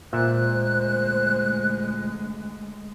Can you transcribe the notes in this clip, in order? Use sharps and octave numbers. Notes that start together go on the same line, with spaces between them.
D2 A#2 G#3 C5 E5 F#6